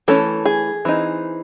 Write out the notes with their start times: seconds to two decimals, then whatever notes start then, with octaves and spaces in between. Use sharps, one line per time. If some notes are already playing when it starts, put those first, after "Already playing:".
0.08 E3 A3 C#4 A4
0.45 G#4
0.85 E3 C4 D#4